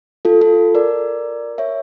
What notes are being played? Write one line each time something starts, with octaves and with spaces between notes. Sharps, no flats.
F4 A4
F4 A4
A#4 D5
C#5 E5